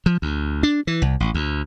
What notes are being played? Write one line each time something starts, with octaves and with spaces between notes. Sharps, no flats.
F3
D2
D4
E3
C2
A1
D2